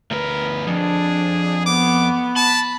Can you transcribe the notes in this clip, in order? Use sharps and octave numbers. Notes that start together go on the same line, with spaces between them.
D2 A#4 B4
F2 D4 G#4
B3 D6
A5 B5